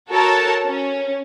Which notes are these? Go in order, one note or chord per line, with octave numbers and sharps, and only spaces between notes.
F#4 A4 A#4 C#5 A5
C#4